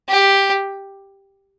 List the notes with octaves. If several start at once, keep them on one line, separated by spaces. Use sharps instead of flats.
G4